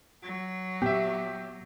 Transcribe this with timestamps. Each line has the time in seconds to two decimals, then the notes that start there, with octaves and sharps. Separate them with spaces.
0.22 F#3
0.82 A#2 B3 G4 E5